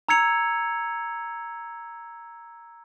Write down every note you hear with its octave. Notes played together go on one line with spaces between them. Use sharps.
A#5 E6 G#6 C#7 F7